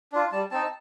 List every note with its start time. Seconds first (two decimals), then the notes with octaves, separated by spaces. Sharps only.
0.12 D4 F4
0.32 G3 A5
0.51 C4 D#4 A5